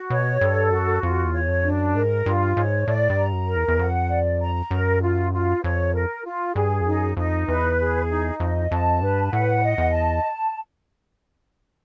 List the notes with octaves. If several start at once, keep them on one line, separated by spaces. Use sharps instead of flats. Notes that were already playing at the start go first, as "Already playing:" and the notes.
Already playing: F#4
B2 C#5
G2 A4
F#2 F#4
F2 F4
E2
C#5
F2
D4
F#2
G#2 A#4
G2 F4
G#2 C#5
A2 D5
G2
A#5
F#2
A#4
E2
E2
F2 F#5
D5
A#5
F#2 A#4
F4
F4
F2 C#5
A#4
F4
G2 G#4
F2
F#2 D#4
F2 D#4
E2 B4
G#4
D#4
F2 D#5
F2 A5
G2 B4
A2 F#5
D#5
E2
A5